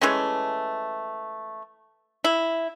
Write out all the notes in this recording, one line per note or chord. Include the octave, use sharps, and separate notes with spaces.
E3 G#3 A3 C#4
E4